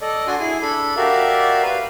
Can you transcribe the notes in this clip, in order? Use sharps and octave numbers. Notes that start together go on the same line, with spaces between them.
A4 D5 D#5
D4 F#4 G#5 C6
E4 G#4 G#5
D4 A4 B5
F#4 G4 A#4 D5 E5 F5
B4 F5